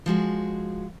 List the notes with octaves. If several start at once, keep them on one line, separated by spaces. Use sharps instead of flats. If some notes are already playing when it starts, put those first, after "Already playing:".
F3 G#3 F#4 G#4